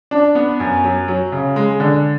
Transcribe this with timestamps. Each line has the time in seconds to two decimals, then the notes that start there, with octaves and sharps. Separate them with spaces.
0.11 D4
0.35 B3
0.60 F#2
0.84 F#3
1.08 F#3
1.32 C#3
1.56 G#3
1.80 D3